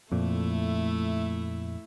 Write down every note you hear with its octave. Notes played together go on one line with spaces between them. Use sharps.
F2 A#2 A3 E4